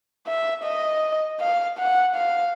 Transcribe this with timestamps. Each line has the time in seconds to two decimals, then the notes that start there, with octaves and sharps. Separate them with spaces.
0.27 E5
0.64 D#5
1.40 F5
1.79 F#5
2.16 F5